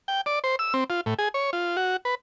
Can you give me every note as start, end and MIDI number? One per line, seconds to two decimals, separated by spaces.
0.08 0.21 79
0.26 0.39 74
0.44 0.56 72
0.59 0.74 88
0.74 0.84 60
0.90 1.01 65
1.06 1.14 45
1.19 1.29 68
1.34 1.50 73
1.53 1.77 65
1.77 1.97 66
2.05 2.15 71